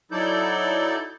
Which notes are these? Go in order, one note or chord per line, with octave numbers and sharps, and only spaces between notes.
F#3 D#4 E4 A4 D5 G6